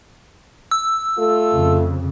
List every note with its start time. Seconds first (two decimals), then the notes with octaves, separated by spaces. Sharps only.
0.71 E6
1.18 A3 F4 A4
1.53 F2 C#3